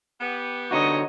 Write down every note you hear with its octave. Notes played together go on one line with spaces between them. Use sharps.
B3 G4
D3 D#4 F#4 C#5 D#5